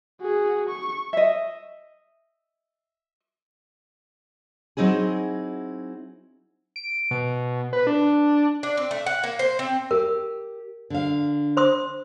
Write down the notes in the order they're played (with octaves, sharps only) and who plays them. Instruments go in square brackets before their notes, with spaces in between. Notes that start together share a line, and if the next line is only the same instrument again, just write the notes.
[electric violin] F#4 G#4
C#6
[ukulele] D#5 E5
[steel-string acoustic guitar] F#3 C4 D#4 E4 G#4
[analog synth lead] D7
B2
B4
D4
[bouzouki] D4
C4
A3
F#5
A#3
C5
C4
[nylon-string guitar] G4 [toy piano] A#4
[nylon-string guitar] D3 F5
[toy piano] C5 C6 D#6